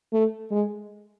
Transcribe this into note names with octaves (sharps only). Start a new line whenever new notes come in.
A3
G#3